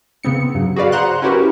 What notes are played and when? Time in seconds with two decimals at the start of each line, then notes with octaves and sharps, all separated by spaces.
0.23 C#3 B3 C4 C#7
0.55 G2 C#3 F#3
0.76 F#4 G#4 B4 D5 F5
0.92 C5 F#5 A#5 C6 F#6
1.22 C#4 E4 F#4 G4 A#4 B4